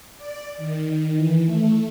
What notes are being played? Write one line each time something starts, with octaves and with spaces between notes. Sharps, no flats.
D5
D#3
E3
A3